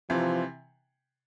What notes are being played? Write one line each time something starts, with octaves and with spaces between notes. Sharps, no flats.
C3 E3 F3